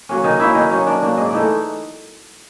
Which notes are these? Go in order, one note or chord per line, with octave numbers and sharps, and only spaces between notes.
F#3 A#3 C#4
D#3 D#4 D#5
F#3 A#3 C#4 E4 E5
D#3 D#4 D#5
F#3 A#3 C#4
D#3 D4 D5
F#3 A#3 C#4
G#2 D#5
D5
E3 A3 D#4 D#5